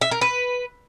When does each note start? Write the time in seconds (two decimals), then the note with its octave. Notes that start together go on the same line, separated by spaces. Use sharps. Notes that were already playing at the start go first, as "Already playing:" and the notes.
0.01 E5
0.11 A#4
0.21 B4